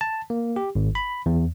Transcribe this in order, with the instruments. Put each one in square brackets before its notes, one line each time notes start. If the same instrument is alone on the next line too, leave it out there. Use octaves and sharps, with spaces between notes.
[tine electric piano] A5
A#3
G4
G#1
B5
E2